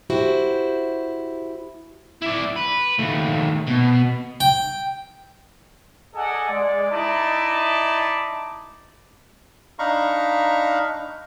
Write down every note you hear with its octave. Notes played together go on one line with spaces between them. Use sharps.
E4 F#4 G4 C5
E4 D5
B4
D#2 A3
B2
G5
G#4 A4 D5 D#5 F#5 G#5
G#3 D5
D#4 E4 D5 D#5 A5 B5
D4 D#4 F5 A#5 B5 C#6